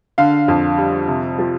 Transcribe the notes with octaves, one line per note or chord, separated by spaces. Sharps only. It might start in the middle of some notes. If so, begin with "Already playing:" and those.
D3 F5
F2
G3
C3
F3